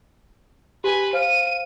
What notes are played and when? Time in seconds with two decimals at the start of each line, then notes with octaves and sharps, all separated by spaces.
0.84 G4 B4 G#5
1.13 C5 F5 F6 D#7